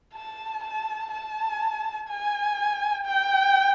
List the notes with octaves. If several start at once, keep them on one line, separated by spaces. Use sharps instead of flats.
A5
A5
A5
G#5
G5